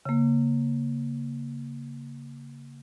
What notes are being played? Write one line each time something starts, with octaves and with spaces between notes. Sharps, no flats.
C#3 A#3